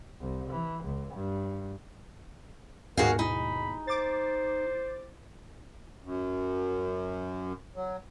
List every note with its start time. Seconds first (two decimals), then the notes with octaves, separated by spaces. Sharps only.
0.20 C2
0.50 E3
0.84 C#2
1.14 G2
2.97 D#2 G#2 B2 F#4 G#4 A#4 F5
3.19 D#4 B5
3.87 C5 D6 A6
6.04 F#2
7.76 F#3